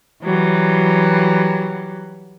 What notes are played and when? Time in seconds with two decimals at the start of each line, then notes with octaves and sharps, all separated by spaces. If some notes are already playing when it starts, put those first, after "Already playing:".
0.23 E3 F#3 G3